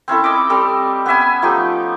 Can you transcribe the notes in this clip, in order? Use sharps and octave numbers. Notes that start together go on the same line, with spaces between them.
C4 C#4 E4 A4
D#5 B5 D6
G3 C4 A4
B3 C#4 E5 G#5
F3 A3 D#4 G4